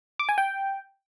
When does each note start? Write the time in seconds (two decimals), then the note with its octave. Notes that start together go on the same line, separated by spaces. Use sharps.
0.20 D6
0.29 G#5
0.38 G5